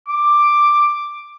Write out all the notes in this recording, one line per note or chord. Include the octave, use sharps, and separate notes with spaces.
D6